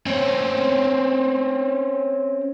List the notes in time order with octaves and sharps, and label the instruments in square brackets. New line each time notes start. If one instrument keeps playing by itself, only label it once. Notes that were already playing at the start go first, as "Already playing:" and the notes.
[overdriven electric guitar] C4 C#4